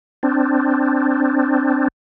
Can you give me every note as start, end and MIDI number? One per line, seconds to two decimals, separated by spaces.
0.23 1.88 60
0.23 1.88 62